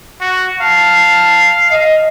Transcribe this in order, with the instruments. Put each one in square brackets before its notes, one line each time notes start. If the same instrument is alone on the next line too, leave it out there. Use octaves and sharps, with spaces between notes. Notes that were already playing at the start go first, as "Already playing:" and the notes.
[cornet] F#4
[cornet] F5 [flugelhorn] A5
[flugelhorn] D#5